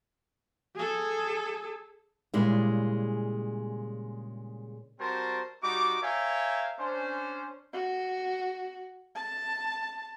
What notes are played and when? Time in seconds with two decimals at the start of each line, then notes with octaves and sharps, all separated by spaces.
0.76 G#4 A4
2.34 A#2 C#3 G3 G#3 D4 E4
4.99 G3 C4 F#4 A#4 C5 A5
5.63 G3 D#4 F#4 D6
6.02 A#4 C#5 E5 F5 G5 G#5
6.80 C#4 D4 C5
7.73 F#4
9.15 A5